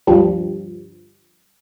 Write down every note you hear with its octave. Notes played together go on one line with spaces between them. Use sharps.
D2 G2 F3 G3